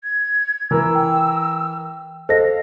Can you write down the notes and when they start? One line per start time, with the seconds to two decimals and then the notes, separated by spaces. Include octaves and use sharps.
0.03 G#6
0.71 E3 A#4 E6
0.95 G5
2.29 A4 C5 D#5 F5 A#6